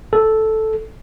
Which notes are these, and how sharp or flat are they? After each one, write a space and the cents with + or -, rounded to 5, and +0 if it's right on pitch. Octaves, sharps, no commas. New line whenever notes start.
A4 -5